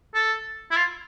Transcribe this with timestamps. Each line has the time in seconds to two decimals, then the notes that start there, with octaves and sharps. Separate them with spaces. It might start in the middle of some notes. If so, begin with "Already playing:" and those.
0.15 A4
0.71 E4
0.76 F4